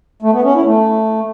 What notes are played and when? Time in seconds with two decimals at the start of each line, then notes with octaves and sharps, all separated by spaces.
0.22 A3
0.33 B3
0.44 C#4
0.55 E4
0.65 A3